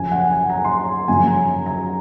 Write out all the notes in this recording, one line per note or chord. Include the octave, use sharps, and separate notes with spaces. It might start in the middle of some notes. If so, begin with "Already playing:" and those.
Already playing: F#2 C#3 F3 G#5
F#5
G#5
A#5
C6
A#5
F#2 C#3 F3 G#5
A#5
A#5